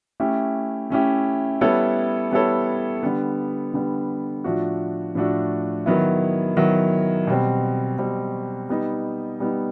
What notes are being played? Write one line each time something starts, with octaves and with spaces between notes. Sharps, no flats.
A3 C#4 E4 G4
A3 C#4 E4 G4
G3 B3 E4 A4 C#5
G3 B3 E4 A4 C#5
D3 G3 B3
D3 G3 B3
A2 F3 A3 D4 F#4
A2 F3 A3 D4 F#4
D#3 F#3 B3 E4
D#3 F#3 B3 E4
B2 G3 C4
B2 G3 C4
G3 B3 D#4
G3 B3 D#4